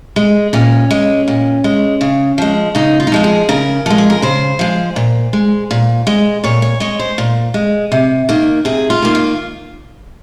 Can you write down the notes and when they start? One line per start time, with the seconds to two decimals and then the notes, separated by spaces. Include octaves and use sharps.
0.16 G#3
0.53 A#2 C#4
0.91 G#3
1.28 A#2
1.64 G#3
2.01 C#3
2.38 F3 G#3
2.75 C#3 D#4
3.00 F4
3.07 D#4
3.12 F3 G#3 F4
3.24 G#4
3.49 C#3 A#4
3.86 F3 G#3
3.98 G#4
4.10 A#4
4.22 C#3 C5
4.59 F3 G#3
4.96 A#2
5.33 G#3
5.71 A#2
6.07 G#3
6.44 A#2 C#5
6.62 C#5
6.80 G#3 C#5
6.99 C5
7.18 A#2
7.54 G#3
7.92 C3
8.29 D#3 A#3
8.65 C3 G#4
8.90 F4
9.02 D#3 A#3
9.15 F4